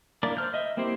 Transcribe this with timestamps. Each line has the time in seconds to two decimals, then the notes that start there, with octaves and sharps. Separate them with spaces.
0.23 A#3 D4 E4 A#4 D5
0.37 C5 F6 G6
0.54 D#5 E5
0.77 A#3 C4 E4 G4 C5